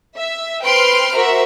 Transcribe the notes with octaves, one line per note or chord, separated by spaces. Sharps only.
E5
B4 C5 G5 C6 F6 D7
F#4 A#4 C5 E5